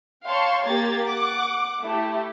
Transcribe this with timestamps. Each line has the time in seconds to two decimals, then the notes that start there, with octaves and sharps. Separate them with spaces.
0.25 C#5 F5 G5 A5 C6 C#6
0.65 A#3 G4 A#5 G#6 A6
1.05 F#5 D6
1.84 A3 E4 G4